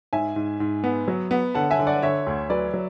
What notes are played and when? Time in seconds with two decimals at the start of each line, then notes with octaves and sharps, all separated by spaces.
0.13 G#2 E5 G#5
0.36 G#2
0.60 G#2
0.84 B3
1.08 F#3
1.31 B3
1.55 D3 F#5 A5
1.71 E5 G#5
1.79 D3
1.87 D5 F#5
2.02 D3 C#5 E5
2.27 D2
2.50 F#3 B4 D5
2.74 F#3